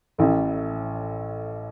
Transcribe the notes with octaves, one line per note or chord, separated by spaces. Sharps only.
A1 A2